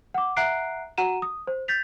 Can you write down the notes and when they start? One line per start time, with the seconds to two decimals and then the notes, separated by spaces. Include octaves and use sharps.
0.14 F#5 D6
0.36 E5 F#5 A#5 F#6 C7 D7
0.98 F#4 F#5 A#5 D#7 E7
1.22 D#6
1.47 C5
1.68 G6 A6 B6 F7